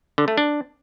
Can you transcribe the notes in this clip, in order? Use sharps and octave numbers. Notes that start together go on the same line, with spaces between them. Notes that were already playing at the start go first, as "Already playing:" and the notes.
D3
A3
D4